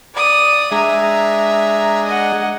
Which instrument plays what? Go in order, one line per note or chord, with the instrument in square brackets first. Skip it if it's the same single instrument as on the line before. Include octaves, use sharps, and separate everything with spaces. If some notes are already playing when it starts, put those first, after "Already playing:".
[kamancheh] D5 D#6
[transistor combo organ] G#3 D4 G#4 [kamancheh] E5 A#5
[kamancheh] D#5 F#5